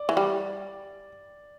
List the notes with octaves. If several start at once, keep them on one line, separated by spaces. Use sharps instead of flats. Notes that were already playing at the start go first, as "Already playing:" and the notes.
Already playing: D5
E3
G3